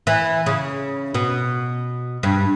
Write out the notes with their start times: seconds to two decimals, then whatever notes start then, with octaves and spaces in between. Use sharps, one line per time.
0.07 E3
0.46 C#3
1.14 B2
2.23 G2